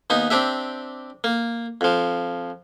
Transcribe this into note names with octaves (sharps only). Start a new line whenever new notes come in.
D#2 B3 D#4
C4 D4 G4 E5
A#3
F2 F3